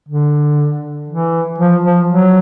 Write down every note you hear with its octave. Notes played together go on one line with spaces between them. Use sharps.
D3
E3
F3
F3
F#3